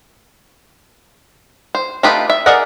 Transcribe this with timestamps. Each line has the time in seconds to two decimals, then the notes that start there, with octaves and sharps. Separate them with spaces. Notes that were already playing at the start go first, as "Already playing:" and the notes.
1.75 C5
2.03 A3 D#4 F4 G4 B4
2.30 E5
2.46 G#4 A#4 D5 D#5 F#5